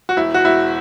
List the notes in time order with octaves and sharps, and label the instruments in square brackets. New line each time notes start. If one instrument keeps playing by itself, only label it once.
[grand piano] F#4
E1 E4
F#4
E1 E4